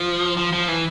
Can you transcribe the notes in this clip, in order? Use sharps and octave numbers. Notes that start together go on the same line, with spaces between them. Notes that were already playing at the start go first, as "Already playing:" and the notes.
Already playing: F3
F3
F3
E3